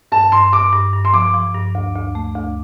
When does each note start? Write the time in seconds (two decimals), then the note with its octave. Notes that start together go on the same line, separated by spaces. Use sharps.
0.12 G2 A5
0.32 G2 C6
0.53 G2 D6
0.73 G2
0.93 G2
1.05 C6
1.14 F3 D6
1.34 F3
1.55 G2
1.75 D2
1.95 D2
2.15 A3
2.36 D2